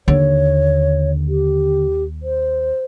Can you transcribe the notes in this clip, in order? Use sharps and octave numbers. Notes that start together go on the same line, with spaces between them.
D#2 D3 C#5
G4
C5